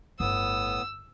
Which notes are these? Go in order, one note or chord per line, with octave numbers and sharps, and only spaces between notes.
G1 A2 B3 D#6 E6